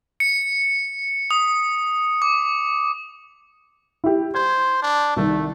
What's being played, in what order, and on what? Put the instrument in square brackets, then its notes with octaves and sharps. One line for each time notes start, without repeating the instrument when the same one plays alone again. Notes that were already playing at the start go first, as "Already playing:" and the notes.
[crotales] C#7
D#6
D6
[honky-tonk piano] E4 G4
[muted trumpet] C5 [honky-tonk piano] G#6
[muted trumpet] D4
[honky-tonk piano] C2 D#3 [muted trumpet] A3